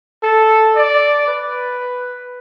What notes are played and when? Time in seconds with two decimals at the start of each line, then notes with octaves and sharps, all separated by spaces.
0.23 A4
0.76 D5
1.27 B4